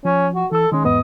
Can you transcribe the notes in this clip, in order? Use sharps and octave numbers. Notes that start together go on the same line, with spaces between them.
F3 C#4
F#4
E3 A4 E6
D#3 G#3 C#4
E2 G#2 B3 D#5